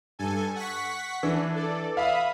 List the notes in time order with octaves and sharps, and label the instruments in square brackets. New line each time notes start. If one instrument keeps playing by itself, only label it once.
[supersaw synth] G2 A4 G#5
F#5 C#6 B6
[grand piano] E3 [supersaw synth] D4
[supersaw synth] A4 D5
[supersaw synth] E5 B5 D#6 [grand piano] F5